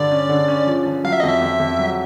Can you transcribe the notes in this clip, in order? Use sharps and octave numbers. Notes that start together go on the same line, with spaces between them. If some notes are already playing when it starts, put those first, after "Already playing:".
Already playing: G2 D3 D5
C#4
D3
C#4
F3
F3
F#3 F5
E5
D#5
F2 E5
F2
F2
F#3